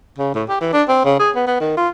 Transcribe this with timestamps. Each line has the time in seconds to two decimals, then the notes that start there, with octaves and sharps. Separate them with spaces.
0.18 C#3
0.35 A2
0.49 G4
0.61 E3
0.73 D4
0.88 C4
1.05 C#3
1.19 G#4
1.35 B3
1.47 B3
1.60 D#3
1.77 F4